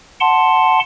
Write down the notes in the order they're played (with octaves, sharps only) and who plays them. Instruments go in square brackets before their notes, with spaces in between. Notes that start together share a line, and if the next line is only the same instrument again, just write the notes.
[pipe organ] F#5 A5 C6